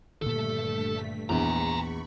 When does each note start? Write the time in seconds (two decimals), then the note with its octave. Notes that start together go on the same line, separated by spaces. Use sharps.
0.22 G2 A#2 D3 D#3 A3 A4 B6
1.30 A#1 E2 G#5 A#5 B5 C#6